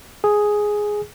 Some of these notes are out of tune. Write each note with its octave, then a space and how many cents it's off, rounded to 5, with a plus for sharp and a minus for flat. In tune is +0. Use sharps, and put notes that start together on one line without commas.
G#4 +5